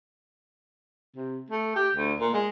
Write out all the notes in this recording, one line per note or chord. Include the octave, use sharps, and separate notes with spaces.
C3
A3
G4
D2
A#2
G#3